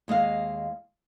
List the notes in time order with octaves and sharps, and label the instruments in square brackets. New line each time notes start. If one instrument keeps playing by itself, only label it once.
[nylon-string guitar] D#2 G#3 D#5 F5